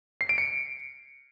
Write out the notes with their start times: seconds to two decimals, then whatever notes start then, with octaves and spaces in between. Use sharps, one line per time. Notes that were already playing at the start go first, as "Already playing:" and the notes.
0.21 C7
0.29 D7
0.38 C#7